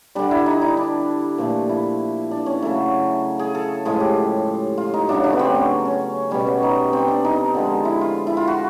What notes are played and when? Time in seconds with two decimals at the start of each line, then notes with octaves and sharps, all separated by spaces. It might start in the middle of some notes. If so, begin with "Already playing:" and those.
0.15 D3 G3 D4
0.31 E4
0.46 D#4
0.62 E4
0.77 D4
1.38 A#2 F3 A3
1.69 E4
2.31 D4
2.46 C#4
2.62 C#3 F#3 A3
3.39 G#4
3.55 A4
3.85 A2 F3 G#3 G#4
4.00 G4
4.78 F4
4.94 D#4
5.09 C#3 F#3 A3 D4
5.24 D4
5.33 B3
5.39 C4
5.55 C#4
5.85 C#4
6.31 B2 G3 C#4
6.47 C#4
6.63 D#4
6.93 C4
7.08 D4
7.25 D#4
7.55 D3 F3 G#3
7.85 E4
8.01 F4
8.27 E4
8.37 F4
8.48 F#4